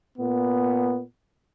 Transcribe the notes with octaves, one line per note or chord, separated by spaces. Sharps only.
A#2 B3